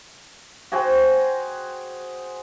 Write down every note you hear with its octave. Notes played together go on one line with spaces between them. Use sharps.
F#4 G#4 C5 G5